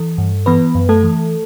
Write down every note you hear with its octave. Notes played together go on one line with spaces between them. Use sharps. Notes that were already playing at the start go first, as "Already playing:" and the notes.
Already playing: E3 A4
G2
E3 B3 B4
F#2
A3 A4
E3